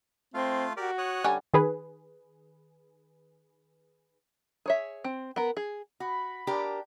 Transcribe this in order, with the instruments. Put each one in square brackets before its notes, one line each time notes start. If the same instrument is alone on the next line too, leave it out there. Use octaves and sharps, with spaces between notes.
[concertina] A3 F4 F5 [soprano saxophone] C4
[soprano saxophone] F#4 [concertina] G4 A#4 D5
[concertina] C#5 D#6 F#6
[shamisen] D3 G3 C#4 [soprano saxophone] G#5
[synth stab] D#3 G#4 B4
[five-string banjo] G#4 C#5 E5
C4
B3 A#4
G#4
[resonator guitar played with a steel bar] F#4 [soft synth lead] B5
[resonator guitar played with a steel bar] D4 G4 A#4